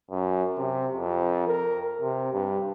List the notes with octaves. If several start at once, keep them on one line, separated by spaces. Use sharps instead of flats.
F#2
C3
F2
A#4
C3
G2